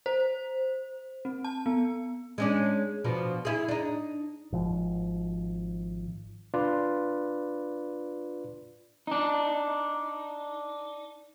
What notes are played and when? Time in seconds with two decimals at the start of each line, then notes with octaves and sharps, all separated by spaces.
0.06 C5
1.25 C4
1.44 A5
1.66 B3
2.38 G#3 C#4 D4
3.04 B2 F3 D4
3.45 E4 G#4
3.68 D4 D#4
4.52 G#1 F3
6.54 D4 F4 B4 D5
9.07 D4 D#4